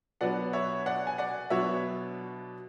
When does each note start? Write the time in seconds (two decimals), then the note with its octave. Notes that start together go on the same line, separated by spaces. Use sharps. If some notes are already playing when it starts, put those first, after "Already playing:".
0.21 B2 F#3 B3 D4 D5 F#5
0.53 C#5 E5
0.86 D5 F#5
1.07 G#5
1.18 D5 F#5
1.50 B2 F#3 B3 D4 C#5 E5